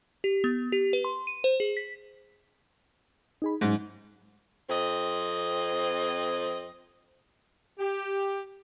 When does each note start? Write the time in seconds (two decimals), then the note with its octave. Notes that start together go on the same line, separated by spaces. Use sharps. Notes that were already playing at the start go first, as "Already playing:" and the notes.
0.24 G4
0.44 B3
0.72 G4
0.93 B4
1.04 C6
1.27 D#7
1.44 C5
1.60 G#4
1.77 B6
3.42 D#4 G#4 B5
3.61 G#2 F#3 C#4 D#4
4.70 F2 C4 D#5
7.79 G4